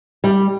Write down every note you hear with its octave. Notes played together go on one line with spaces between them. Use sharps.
G3